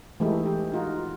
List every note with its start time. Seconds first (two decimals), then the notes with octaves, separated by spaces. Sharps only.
0.20 E3 G#3 A3 D#4 E4 G4
0.46 G4
0.72 D#4 F4 F#4